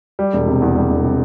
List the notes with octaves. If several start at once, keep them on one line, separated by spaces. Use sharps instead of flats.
G3
E1
C3
E2
G3
E1
C3